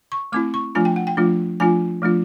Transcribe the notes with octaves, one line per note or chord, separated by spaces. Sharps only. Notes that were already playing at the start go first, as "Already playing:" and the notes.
C#6
A3 C4 E4 D6
C#6
F3 A3 D4 F4 G#5
G5
F#5
G5
F3 A3 D4 F4
F3 A3 D4 F4 G#5
F3 A3 D4 F4